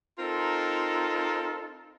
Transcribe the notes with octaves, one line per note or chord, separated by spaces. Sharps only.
C4 D#4 F4 A4 A#4